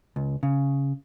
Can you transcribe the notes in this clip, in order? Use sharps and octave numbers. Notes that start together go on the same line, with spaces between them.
C#2
C#3